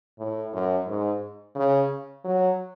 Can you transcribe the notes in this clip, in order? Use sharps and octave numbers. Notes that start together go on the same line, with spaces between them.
A2
F#2
G#2
C#3
F#3